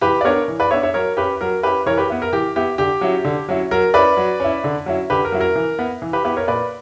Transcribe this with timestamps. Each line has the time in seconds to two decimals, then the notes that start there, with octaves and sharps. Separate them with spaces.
0.01 E3 G4 B4
0.21 D5
0.25 B3 D4 A#4 C#5
0.48 E3
0.60 B4 D5
0.71 B3 D4 C#5 E5
0.83 C#5 E5
0.94 F#3 A#4 C#5
1.17 C#4 E4 G4 B4
1.41 F#3 A#4
1.63 C#4 E4 G4 B4
1.86 E3 A#4 C#5
1.98 G4 B4
2.10 B3 E4
2.22 A#4
2.33 E3 G4
2.56 B3 E4 G4
2.78 D3 G4
3.01 F#3 C#4 E4
3.24 D3
3.49 F#3 C#4 E4
3.71 F#3 A#4
3.94 C#4 E4 B4 D5
4.17 F#3
4.40 C#4 E4
4.64 D3
4.86 F#3 C#4 E4
5.10 D3 G4 B4
5.25 A#4
5.32 F#3 C#4 E4
5.41 A#4
5.56 E3
5.79 B3 E4
6.02 E3
6.13 G4 B4
6.24 B3 E4 G4 B4
6.37 A#4 C#5
6.48 A#2 B4 D5